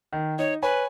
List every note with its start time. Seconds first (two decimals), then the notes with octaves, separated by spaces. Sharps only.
0.13 D#3
0.39 D#4 C#5
0.62 B4 C#5 G#5 B5